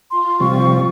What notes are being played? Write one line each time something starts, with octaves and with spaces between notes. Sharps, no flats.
F4 C6
C3 F3 G3 C#6